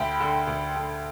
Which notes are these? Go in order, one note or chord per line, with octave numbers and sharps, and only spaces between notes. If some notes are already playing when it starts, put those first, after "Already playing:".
Already playing: D2 G5 B5
D3
D2
D3